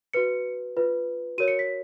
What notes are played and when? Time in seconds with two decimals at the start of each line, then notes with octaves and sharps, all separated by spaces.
0.13 F#4 B4 C#7
0.77 F4 B4
1.38 F#4 A#4 C#5 D#7
1.48 C#7
1.59 B6